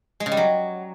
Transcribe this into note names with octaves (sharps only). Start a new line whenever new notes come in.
G#3
C#3
G3
F#3